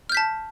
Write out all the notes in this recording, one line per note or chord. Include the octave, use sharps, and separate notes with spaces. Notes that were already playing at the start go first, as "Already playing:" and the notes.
A5 F6 G6 B6